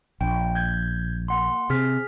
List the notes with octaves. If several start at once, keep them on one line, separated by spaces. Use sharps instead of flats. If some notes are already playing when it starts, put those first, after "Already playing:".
A#1 G5
G6 G#6
A#3 F#5 C6
C3 G#4 F6 B6